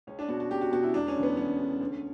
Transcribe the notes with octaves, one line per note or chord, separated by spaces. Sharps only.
C#2 C#4
D4
B2 F#4
F#4
C#2 G4
F#4
B2 F#4
E4
E1 D4
C#4
D2 C#3 E3
B3
E1 C#4
D2 C#3 E3
D2